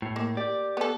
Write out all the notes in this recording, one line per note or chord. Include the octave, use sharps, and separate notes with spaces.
A2
A#3
G4 D5
B3 A4